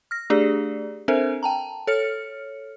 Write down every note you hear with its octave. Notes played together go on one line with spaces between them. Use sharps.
F6 A#6
A3 D4 G4 G#4 D5
C4 D4 A4 A#4 C5 E5
G5 A5 A#5
A4 C#5 F6 C#7